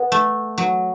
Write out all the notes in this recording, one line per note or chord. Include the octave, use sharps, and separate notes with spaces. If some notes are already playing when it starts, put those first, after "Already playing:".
Already playing: B3
A3
F#3